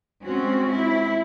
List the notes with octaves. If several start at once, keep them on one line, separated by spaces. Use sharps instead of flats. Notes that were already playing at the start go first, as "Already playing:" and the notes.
G#3 C4 C#4 F#4
E4